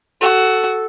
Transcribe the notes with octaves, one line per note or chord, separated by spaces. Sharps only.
F#4 A4